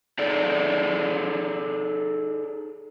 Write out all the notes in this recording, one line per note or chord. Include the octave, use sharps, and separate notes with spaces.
D#4 G#4 A4 D5